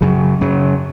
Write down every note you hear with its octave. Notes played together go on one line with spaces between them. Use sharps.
F#2 C#3 F#3
F#2 C#3 F#3